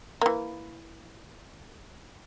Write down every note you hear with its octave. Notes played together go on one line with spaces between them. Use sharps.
E3 A#3